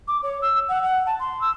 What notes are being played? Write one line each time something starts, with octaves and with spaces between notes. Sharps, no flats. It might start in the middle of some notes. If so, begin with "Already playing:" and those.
D6
C#5
E6
F#5
F#5
A5
C6
E6